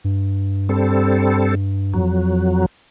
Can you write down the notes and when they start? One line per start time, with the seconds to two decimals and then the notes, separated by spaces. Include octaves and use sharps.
0.04 G2
0.69 G3 C4 A4
1.93 F2 F#3